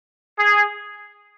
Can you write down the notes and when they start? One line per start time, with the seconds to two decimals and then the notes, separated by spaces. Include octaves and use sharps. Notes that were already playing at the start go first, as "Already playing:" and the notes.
0.38 G#4